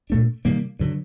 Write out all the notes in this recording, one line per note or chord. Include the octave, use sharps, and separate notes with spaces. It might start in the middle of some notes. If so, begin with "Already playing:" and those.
A#2 A3 D4
C3 D#3 G3 A#3
G2 D3 F#3